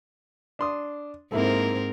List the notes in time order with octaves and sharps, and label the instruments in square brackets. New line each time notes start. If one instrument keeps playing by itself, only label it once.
[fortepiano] D4 C6 D#6
[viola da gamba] G#2 C4 A#4 [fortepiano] A#3 E4 A4